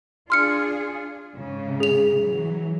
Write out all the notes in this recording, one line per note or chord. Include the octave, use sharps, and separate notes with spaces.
D4 F4 G#4 C6 F6 C#7
G#2 C#3
G#4 F7
E3 F#3